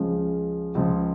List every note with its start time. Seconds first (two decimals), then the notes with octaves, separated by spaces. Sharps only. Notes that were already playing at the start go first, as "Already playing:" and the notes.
Already playing: C#2 C#3 F3
0.75 C#2 C#3 F3